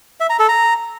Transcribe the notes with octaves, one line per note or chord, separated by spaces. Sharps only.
E5
A#5
A4
A#5